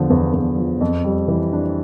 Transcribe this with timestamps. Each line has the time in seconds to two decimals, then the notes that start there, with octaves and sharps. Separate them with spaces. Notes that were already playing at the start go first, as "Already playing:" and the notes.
Already playing: E2 D3 F3
0.10 E2
0.34 E2
0.57 F3
0.81 F2
1.04 G3
1.28 E3
1.53 D4